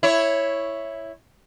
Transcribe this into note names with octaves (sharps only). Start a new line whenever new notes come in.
E4 C#5